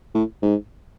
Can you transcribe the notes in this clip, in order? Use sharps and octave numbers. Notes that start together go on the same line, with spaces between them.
A2
G#2